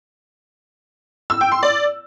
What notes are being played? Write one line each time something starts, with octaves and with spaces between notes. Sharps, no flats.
E6
G5
C6
D5